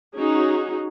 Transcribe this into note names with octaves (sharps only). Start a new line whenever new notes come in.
C#4 D#4 F#4 G#4